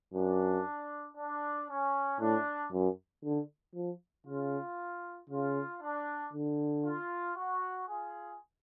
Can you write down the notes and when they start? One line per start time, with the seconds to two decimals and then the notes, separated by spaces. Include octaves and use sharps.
0.14 F#2 D4
1.17 D4
1.69 C#4
2.20 A2 D4
2.73 F#2
3.24 D3
3.75 F3
4.27 C#3 F4
5.30 C#3 F4
5.82 D4
6.33 D3
6.85 F4
7.36 F#4
7.88 F4 G#4